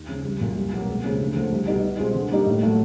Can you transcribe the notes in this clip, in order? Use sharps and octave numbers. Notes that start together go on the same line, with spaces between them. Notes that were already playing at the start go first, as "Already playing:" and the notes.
Already playing: D#2
C#3 F3 G#3 C#4
C2
A#2 F#3
C2
B2 F#3 A#3
C#2
C#3 F3 G#3
D2
D3 F3 A3
C2
B2 G3 B3 D#4
B2
G#3 C4 F4
D3
G3 A#3 D#4 G4
A2
F#3 A3